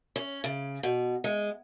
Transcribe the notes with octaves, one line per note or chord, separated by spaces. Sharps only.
C#4
C#3
B2
G#3